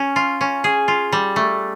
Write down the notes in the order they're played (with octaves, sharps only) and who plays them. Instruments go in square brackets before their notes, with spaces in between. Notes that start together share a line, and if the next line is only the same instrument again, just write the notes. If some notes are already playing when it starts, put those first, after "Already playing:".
Already playing: [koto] C#4
F4
C#4
G#4
F4
G3
A3